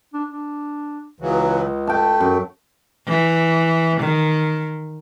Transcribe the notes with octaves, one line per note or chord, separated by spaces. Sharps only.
D4
D4
C#2 C#3 E3 F#3
A3 G5 A5
F#2
E3
D#3